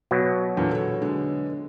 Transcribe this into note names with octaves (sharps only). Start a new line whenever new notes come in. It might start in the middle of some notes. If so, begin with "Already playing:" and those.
B2 F#3
E2 A#2 D3
A4 C#5
D3 G#3